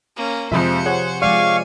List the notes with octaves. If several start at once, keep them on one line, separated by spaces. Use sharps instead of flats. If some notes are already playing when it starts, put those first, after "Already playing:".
A#3 C#4
F2 C3 F3 G#3 F4 C5 E5 C#7
G#4 C#5 F#5
F3 G#3 D5 F5 G#5 C#6